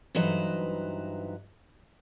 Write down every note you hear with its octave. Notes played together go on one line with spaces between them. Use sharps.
G2 E3 F#3 D#4 B4 C5